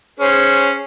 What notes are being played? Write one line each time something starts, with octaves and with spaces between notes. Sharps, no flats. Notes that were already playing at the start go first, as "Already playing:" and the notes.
C#4 G#4 C5